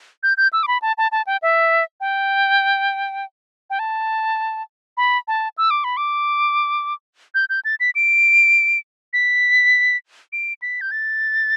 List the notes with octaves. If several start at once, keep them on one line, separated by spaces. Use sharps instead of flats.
G6
G6
E6
D6
B5
A5
A5
A5
G5
E5
G5
G5
A5
B5
A5
E6
D6
B5
D6
G6
G6
A6
B6
D7
B6
D7
B6
G6
A6